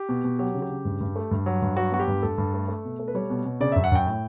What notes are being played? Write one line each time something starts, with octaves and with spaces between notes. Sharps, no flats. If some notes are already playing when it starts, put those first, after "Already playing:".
Already playing: G4
B2
B2
F#3 G4
C#3
G4
C#3
G2
G2
A3
G2
F#3
G2
F#3 F#4
B3 F#4
G4
G2
G2 A4
G2
A3
A3
B2
A3
B4
G3 C#5
B2
B2
C#3 D5
F#2 E5
F#5
F#2 G5
A2